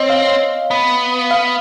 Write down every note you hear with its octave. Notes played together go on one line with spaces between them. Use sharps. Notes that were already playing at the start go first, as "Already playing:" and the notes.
Already playing: C4 C#5 D#5
F5
B3
F5